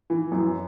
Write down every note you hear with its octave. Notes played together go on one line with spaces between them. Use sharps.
E3
F#2